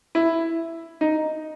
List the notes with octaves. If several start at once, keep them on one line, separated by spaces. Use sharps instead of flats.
E4
D#4